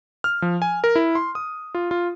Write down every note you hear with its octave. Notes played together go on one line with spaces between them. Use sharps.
F6
F3
G#5
A#4
E4
C6
D#6
F4
F4